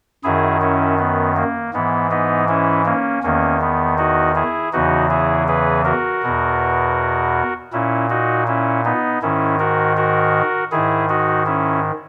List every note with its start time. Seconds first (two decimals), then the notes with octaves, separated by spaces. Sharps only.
0.24 F#2 D#3 E4 G#4
0.62 C#4 E4
0.99 B3
1.37 A#3
1.74 G#2 E3 B3
2.11 B3 D#4
2.48 C#4 E4
2.86 A#3 C#4
3.23 E2 D#3 A#3 C#4
3.61 B3
3.98 D#4 F#4
4.35 E4 G#4
4.73 E2 C#3 E3 D#4 F#4
5.10 E4 G#4
5.48 G#4 B4
5.85 F#4 A#4
6.23 E2 B2
7.73 A#2 C#4 E4
8.10 D#4 F#4
8.47 C#4 E4
8.85 B3 D#4
9.22 G#2 D#3 C#4 E4
9.59 F#4 A#4
9.97 F#4 A#4
10.72 G#2 D#3 E4 G#4
11.09 D#4 F#4
11.46 C#4 E4